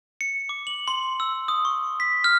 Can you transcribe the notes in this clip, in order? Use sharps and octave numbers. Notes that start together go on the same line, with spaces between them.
C#7
D6
F#7
C6
E6
D#6
C#6
B6
F6